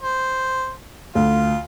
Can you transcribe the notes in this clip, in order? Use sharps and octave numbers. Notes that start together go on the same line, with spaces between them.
C5
D2 F4